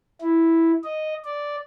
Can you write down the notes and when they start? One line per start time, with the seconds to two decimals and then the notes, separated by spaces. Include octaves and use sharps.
0.22 E4
0.84 D#5
1.24 D5